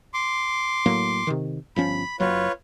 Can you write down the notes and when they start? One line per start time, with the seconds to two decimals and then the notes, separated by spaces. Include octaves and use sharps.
0.14 C6 D6
0.86 A2 F#3 A#3
1.27 C3 D#3
1.76 G1 F3 C#4 B5
2.20 F#1 F#3 F4 B4 C#5